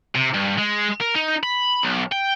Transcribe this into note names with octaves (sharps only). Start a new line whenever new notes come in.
C3
G2
G#3
A#4
D#4
B5
B1
G5